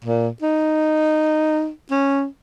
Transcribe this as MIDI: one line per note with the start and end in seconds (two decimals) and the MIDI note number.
0.04 0.29 46
0.42 1.70 63
1.91 2.26 61